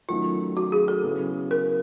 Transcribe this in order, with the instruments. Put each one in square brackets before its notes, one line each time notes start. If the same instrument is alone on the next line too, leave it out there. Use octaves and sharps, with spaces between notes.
[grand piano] D#3 F#3 A3 C#4 [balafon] F4
[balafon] F#4
G#4
A4
[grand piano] C#3 F#3 B3 E4
[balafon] A#4